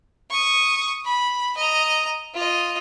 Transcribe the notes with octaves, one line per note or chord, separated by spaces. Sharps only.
C#6 D#6
B5
D#5 A#5
F4 D#5